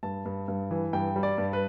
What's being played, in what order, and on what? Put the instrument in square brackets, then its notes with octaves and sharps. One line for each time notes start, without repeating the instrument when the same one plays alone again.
[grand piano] G2 A5
G2
G2
E3
G2 G5
G3
D5
G2
B4